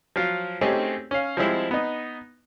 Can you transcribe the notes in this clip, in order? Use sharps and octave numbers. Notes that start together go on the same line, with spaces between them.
F3 F#3 F4
A3 C4 C#4 D#4 G4 G#4
C#4 F5
F3 G3 G#3 C4 E4
B3 D#4